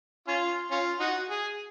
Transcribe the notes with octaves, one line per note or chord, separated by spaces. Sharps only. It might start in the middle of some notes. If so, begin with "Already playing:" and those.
C#4 F4
C#4 F4
D#4 F#4
G#4